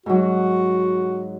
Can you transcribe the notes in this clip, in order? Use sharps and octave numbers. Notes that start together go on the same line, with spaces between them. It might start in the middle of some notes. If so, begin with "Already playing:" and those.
G#2 F#3 F#4